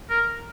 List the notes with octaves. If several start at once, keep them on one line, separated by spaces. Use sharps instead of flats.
A#4